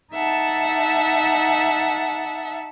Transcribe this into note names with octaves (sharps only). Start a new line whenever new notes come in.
D#4 E5 F#5 A5